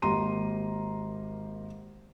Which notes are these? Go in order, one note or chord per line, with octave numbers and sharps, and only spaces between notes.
G#1 A#3 G4 A#5 C6 D#7